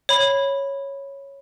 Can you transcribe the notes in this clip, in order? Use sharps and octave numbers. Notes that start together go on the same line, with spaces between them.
C#5 B5